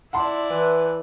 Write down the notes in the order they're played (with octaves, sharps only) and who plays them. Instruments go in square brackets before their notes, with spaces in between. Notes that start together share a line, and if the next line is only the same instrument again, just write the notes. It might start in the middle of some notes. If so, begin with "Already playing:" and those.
[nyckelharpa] E4 D5 [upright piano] F#5 A5 C6
[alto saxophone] E3 [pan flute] B4